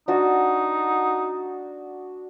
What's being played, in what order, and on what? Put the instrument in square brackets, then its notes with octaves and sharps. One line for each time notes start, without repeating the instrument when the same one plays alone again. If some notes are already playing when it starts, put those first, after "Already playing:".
[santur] D4 F#4 [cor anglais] D#4